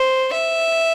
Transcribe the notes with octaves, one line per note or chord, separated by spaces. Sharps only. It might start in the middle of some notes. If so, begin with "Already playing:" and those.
Already playing: C5
E5